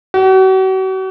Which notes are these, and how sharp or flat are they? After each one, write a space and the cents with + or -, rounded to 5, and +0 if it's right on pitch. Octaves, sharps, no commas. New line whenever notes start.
F#4 +40